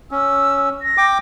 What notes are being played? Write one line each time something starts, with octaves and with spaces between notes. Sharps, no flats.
C#4 E6
A#6
G5 D6